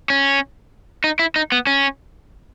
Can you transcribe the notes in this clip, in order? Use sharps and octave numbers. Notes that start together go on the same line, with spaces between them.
C#4
D#4
E4
D#4
B3
C#4